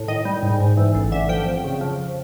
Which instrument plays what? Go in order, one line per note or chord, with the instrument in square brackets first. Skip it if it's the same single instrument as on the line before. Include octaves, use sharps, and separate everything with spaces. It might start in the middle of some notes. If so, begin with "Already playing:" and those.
Already playing: [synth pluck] A2
D#3 D#5
G3
G#2
G#2
E3
A1
D3 E5
F3 G5
F2
C#3
F3